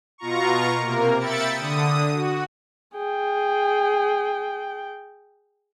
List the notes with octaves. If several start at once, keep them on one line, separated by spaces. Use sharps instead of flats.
B2 F4 A#5 C#6
C3 A#3 A#4
E5 G5 B5 A6 C#7
D3 D#6
F#4
G#4 G5